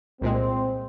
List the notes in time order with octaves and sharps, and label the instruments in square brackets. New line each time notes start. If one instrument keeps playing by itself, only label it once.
[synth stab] C2 A#2 G#3 [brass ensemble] C4